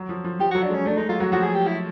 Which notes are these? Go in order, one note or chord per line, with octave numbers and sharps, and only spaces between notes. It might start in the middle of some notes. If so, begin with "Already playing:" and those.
Already playing: F#3
F3
F3
F3 G4
F#3 F#4
D4
G#3 C#4
A3 D4
G#3 D#4
F#3 F4
F#3 F#4
F3 F#4
G#4
G4
E4